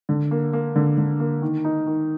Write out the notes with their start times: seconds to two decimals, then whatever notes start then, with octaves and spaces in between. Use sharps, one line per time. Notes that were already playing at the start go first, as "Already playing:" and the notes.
0.09 D3
0.31 A#3
0.53 A#3
0.76 D3
0.98 D3
1.20 A#3
1.42 D#3
1.64 D#4
1.86 D#3